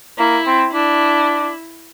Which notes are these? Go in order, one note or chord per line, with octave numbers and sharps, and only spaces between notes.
A#3 E4
C4
D4 E4